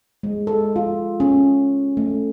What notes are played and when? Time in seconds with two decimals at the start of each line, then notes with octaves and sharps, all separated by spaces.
0.23 G#3
0.47 A4
0.76 F4
1.20 C#4
1.97 A3